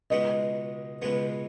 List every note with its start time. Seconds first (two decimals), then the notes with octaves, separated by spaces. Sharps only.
0.10 C#2 B2 G#3 B3 D#5
1.02 C#2 B2 G#3 B3 B4